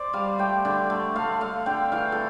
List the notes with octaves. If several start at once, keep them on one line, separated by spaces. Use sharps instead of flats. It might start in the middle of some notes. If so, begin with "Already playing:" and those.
Already playing: C5 D5
G3 F5
A3 G5
D3
A3
A3 F5
A3 F5
D3 G5
E3 F5
A4